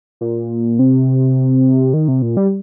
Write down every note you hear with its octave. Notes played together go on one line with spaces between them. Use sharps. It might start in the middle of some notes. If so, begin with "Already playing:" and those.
A#2
C3
D#3
C3
A#2
G3